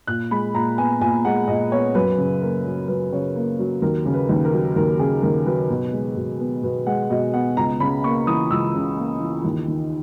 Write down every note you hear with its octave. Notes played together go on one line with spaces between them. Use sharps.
A#2 F#6
G#3 B5
A#2 A#5
B3 G#5
A#2 G#5
G#3 F#5
A#2 D#5
B3 C#5
F#2 B4
C#3
A#3 A#4
F#3
F#2 B4
C#3 C#5
A#3
F#3
D#2 A#4
C#3
B4
D#2
A#4
F#3
D#2 A#4
C#3 G#4
D#2 A#4
F#3 B4
B2
G#3
B2
B3
B2 B4
G#3 F#5
B2 D#5
B3 F#5
C#2 A#5
C#3 B5
A#3 C#6
E3 D#6
C#2 E6
C#3
A#3
E3
D#2
D#3